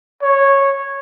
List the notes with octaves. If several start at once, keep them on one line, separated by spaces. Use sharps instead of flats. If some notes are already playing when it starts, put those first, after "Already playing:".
C#5